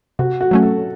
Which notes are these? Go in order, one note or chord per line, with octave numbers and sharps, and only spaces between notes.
C3 F#4
F#4
F#3 A3 C#4
A4